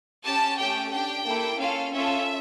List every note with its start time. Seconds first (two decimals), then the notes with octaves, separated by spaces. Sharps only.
0.24 C#4 G4 A5
0.58 A3 C#4 G4 G5
0.92 D4 G4 G5
1.26 A#3 E4 A4
1.59 C#4 F4 A4 F5
1.93 C#4 F4 A4 E5